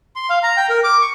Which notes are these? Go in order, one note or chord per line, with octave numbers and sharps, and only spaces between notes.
C6
F5
A#5
G5
A#4
D6
C#6